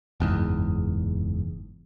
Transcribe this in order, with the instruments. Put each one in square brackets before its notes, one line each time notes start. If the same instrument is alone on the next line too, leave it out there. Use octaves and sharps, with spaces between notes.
[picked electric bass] F#1 E2 G#2